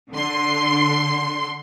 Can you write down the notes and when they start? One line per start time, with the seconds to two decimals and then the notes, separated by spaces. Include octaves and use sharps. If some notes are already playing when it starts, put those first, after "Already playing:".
0.11 D3 C6